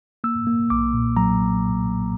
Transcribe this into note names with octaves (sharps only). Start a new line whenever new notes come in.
A#3 E6
A#3
B1 D6
A#2
F#3 A#5